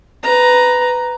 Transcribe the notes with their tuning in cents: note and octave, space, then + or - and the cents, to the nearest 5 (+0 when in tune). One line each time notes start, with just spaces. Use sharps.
B4 +15 A#5 +5